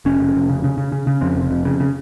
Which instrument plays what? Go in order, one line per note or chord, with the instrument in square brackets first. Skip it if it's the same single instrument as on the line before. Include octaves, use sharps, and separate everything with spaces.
[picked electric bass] F1 C#4
F1
F1
C#3
C#3
C#3
C#3
C#3
F2 C4
F1
F2
C#3
C#3